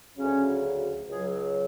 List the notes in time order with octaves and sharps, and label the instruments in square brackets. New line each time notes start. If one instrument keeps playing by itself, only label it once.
[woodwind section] D2 C#3 F#3 C#4
C#2 C#3 F#3 G#4